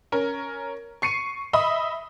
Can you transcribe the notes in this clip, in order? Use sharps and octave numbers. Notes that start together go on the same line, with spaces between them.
C#4 A#4
C#6 C7 C#7 D#7
D#5 E5 B5 D#6